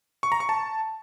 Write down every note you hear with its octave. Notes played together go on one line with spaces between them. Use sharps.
C#6
A#5
C#6
A5